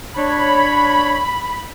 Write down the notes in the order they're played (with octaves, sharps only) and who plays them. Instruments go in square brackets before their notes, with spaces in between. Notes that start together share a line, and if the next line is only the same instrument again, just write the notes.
[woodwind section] D4 C#5 [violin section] B5